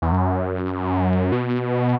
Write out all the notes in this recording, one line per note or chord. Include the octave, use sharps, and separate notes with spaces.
E2
F#2
B2